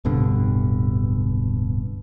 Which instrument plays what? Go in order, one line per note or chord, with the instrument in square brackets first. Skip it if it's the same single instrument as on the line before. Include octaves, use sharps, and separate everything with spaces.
[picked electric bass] D1 G2 B2 D3